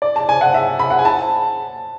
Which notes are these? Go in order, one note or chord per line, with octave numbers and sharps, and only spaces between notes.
D5
A5
G#5
F#5
E5
B5
F#5
G#5
A5